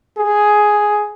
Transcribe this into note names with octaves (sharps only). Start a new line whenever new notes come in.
G#4